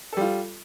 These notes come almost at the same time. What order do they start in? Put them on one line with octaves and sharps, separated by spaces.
A4 G3 F4